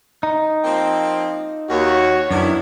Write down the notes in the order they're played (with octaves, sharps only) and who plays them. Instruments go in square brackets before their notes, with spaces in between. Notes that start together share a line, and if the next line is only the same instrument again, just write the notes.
[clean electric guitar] D#4
[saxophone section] F3 A#3 C4
[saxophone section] D#2 [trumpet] F#4 [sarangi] C#5
[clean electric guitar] F#2 [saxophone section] D#3 B3 E4 [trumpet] D4